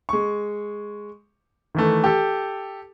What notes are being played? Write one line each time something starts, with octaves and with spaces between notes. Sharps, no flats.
G#3 C#6
D#3 E3 A3
G4 A4